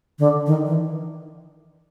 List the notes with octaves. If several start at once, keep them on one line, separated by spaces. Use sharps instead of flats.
D3
D#3
E3